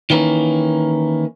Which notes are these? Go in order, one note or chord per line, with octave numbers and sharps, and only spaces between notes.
D#3 E3 A#3 C#4